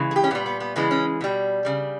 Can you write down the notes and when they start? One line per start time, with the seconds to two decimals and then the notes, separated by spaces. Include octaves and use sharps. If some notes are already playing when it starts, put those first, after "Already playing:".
Already playing: C#3 E3 G#3
0.11 G#4
0.16 G4
0.24 C#4
0.31 A#2 G3 B3
0.46 B3
0.60 B3
0.76 C#3 E3 G#3 B3
0.91 C#4
1.21 B2 G3
1.65 C#3 G3